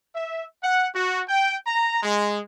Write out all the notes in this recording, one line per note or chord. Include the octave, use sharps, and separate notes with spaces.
E5
F#5
F#4
G5
A#5
G#3